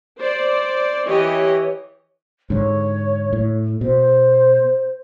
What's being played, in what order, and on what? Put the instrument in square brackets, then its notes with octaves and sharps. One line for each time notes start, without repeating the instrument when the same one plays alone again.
[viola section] C5 D5
E3 G4 C#5 D#5
[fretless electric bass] G#2 D3 [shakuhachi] C#5
[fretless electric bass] A2
[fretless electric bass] B2 [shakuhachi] C5